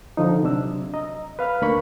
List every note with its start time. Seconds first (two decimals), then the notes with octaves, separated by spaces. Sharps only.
0.17 D3 F3 D#4
0.43 C3 F#3 D4 E6
0.94 D#5 A#5
1.39 B4 F5 B5 F6
1.62 D2 A#3 D4 B5 C#6